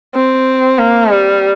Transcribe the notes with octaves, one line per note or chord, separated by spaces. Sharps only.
C4
A#3
G3